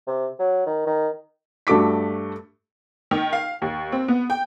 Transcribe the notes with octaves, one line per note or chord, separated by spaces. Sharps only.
C3
F#3
D#3
D#3
G2 A3 F#4 D6 B6
D#3
F5
D#2
C4
B3
G5